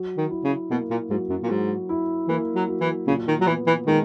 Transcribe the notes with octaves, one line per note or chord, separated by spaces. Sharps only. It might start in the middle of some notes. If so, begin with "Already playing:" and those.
Already playing: F#3
D#3
E4
C#3
B2 A#3
A#2
G#2 F#3
F#2
A#2
G#2 F#3
E4
E3 A#3
F#3
F#3
E3
A#2 C#3
D#3
F#3
E3 B3
E3
D#3 G#3